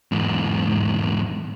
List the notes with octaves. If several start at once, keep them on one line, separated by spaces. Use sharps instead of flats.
E2 G#2